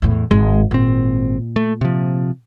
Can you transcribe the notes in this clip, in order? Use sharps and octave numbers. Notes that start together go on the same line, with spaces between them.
E2 A2
G#1 G#3
G#1 A#2 C4
A3
C3 F3